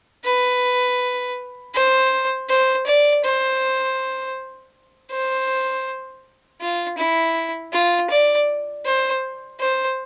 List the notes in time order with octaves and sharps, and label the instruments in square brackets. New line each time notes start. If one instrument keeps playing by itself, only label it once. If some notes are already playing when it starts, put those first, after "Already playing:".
[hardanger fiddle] B4
C5
C5
D5
C5
C5
F4
E4
F4
D5
C5
C5